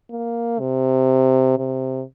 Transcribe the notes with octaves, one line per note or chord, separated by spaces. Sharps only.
A#3
C3
C3